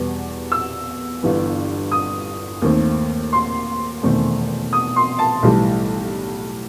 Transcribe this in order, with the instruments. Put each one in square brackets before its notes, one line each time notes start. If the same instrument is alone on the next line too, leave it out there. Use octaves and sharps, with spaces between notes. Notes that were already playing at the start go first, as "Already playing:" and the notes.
Already playing: [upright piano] E2 B2 G3 B3
E6
G1 G2 E3 B3
D#6
D#2 D#3 A3 C4
C6
E1 E2 D#3 A3 C4
D#6
C6
A5
B1 A2 E3 G3